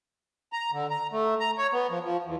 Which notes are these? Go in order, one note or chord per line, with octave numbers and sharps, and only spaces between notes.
A#5
D3
A#5
A3
A#5
C#5
B3
F3
F3
E2